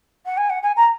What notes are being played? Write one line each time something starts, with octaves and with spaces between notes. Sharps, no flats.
F#5
G#5
F#5
G#5
A#5